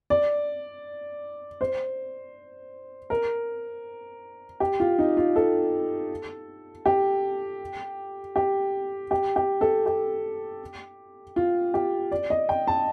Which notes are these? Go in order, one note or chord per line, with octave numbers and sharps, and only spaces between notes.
D5
C5
A#4
G4
F4
D#4
F4
A4
G4
G4
G4
G4
A4
G4
F4
G4
D5
D#5
G5
A5